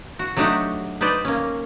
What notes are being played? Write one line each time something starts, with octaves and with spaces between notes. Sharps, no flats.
F#4
F#3 A3 D4 D#4 F#4 G4
D#4 B4 C5 D5
A#3 C#4